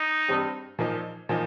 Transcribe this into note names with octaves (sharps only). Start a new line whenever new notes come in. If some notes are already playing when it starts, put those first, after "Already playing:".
Already playing: D#4
G2 G3 C4 G4
A#2 F3 A#3 D#4
A#2 F3 A#3 D#4